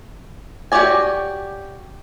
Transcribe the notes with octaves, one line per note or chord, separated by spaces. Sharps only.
F#4 G4 C#5 D5 G#5